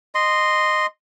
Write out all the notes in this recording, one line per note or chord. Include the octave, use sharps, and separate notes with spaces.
D#5 C6